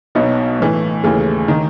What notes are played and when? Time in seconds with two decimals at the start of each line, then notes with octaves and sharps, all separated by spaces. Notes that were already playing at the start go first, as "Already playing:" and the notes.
0.15 B1 B2 F#3 B3 D#4
0.59 A2 E3 A3
1.04 D#2 C#3 E3 A3
1.48 D#3